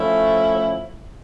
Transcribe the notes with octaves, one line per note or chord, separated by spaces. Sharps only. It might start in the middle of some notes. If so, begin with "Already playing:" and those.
Already playing: F3 A3 C#4 E4